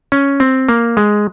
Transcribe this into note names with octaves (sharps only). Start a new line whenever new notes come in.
C#4
C4
A#3
G#3